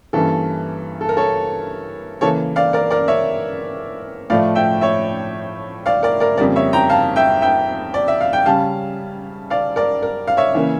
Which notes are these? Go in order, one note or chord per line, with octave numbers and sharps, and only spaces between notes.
G2 E3 A#3 C#4 A4
A4
A#4
A4 C#5
C#3 E3 A#3 A4 C#5
D5 F5
A#4 D5
A#4 D5
C#5 E5
A2 F3 A3 D5 F5
E5 G5
C#5 E5
D5 F5
A#4 D5
A#4 D5
F2 C#3 G3 A#3 A#4 D5
C#5 E5
G5 A#5
F5 A5
E5 G5
E5 G5
D5
E5
F5
G5
C#3 G3 C#4 F5 A5
D5 F5
A#4 D5
A#4
F5
C#5 E5
C#3 E3 A#3 C#4